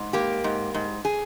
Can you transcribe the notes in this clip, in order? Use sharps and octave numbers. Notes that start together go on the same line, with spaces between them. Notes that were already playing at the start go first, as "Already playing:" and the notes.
Already playing: G#2
A#3 G4
G#2
G#2
G#4